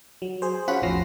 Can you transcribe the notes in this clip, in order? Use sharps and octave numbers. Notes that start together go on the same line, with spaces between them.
F#3
G#4 C5
C#4 F4 F#4 F#5 B5
A1 E2 F3 A#6 C7